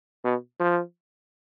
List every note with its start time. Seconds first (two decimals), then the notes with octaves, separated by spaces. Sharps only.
0.24 B2
0.60 F3